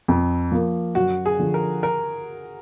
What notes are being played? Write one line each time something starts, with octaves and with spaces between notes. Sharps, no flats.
F2
F3 A#3
F#2 F#4
G#4
D3 F3
A#4
A#4